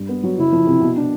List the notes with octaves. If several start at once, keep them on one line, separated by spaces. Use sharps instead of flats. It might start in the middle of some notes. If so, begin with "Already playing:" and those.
Already playing: G2
B3
F#3
F#1 E4
F3
C3
B2
D4